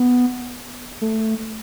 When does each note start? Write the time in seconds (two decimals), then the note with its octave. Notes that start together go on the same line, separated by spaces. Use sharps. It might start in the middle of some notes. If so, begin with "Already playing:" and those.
Already playing: B3
1.01 A3